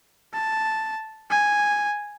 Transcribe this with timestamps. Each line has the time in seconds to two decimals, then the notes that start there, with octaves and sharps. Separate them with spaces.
0.34 A5
1.30 G#5